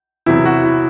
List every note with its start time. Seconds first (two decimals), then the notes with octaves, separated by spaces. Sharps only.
0.26 E2 C3 F#3 E4
0.45 F#4
0.64 E4